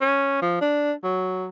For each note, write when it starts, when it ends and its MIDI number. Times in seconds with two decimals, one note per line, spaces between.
0.01 0.39 61
0.42 0.58 53
0.61 0.92 62
1.04 1.49 54